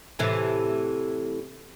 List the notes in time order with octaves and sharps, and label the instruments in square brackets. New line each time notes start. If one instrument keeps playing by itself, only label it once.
[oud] A2 C3 E3